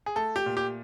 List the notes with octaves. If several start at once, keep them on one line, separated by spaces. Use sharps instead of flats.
G#4
A3 A4
G4
A#2
G4